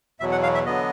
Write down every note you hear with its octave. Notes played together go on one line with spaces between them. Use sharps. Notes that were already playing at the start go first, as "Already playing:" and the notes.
E2 B2 F#3 E5
F#5
F5
E5
D3 F#3 B3 D#5